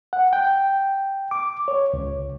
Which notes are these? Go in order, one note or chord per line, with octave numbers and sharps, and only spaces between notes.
F#5
G5
D6
C#5
C#2